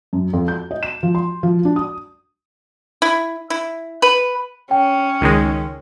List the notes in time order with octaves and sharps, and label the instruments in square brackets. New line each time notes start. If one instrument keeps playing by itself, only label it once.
[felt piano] F#2
F2
G6
D#5
E7
F3
C6
F3
D4
D#6
[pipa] E4
E4
B4
[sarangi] C#4 [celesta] G5
[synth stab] C#2 D#3 G#3